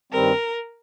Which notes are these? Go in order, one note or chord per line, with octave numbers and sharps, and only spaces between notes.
G2 D#3 G3 C4 A#4